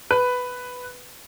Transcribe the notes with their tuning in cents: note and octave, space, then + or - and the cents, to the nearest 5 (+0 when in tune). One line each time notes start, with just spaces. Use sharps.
B4 +5